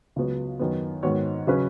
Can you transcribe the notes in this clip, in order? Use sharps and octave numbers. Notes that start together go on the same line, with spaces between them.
C#2 C#3 F#3 B3 F#4
F#2 D#3 B3
G#2 D#3 B3 F#4 C#5
C#3 F#3 C#4 B4